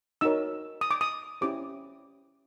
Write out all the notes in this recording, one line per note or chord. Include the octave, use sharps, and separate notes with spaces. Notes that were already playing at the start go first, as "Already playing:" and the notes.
D#4 F#4 A#4 C#5 E6
D#6
D6
D#6
C#4 E4 G4 C5 D6